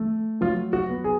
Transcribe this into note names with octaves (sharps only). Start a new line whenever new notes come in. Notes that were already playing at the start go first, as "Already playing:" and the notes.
Already playing: A3
F#3 F4
F#4
B3
G#4